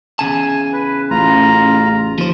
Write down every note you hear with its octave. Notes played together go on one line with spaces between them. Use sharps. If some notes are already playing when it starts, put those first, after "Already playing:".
E2 C#3 G#5 A5
B4
A1 F4 A#5
D#2 F3 C5